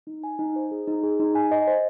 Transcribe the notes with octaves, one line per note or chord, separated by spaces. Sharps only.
D#4
G#5
D#4
C5
G#4
D#4
G#4
D#4
G#5
D#5
C5